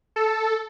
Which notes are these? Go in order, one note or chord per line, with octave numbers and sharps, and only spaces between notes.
A4